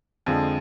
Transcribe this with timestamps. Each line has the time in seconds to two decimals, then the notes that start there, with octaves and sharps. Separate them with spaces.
0.26 F2 D3 F3 G#3